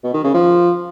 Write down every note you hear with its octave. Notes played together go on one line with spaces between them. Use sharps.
B2
D#3
C#3
F3